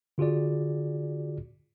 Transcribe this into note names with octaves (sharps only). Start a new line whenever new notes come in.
D3 F4 F#4 G#4 D5